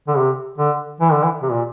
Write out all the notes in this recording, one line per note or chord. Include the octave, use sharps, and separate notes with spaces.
D3
C3
D3
E3
D3
E3
C3
A#2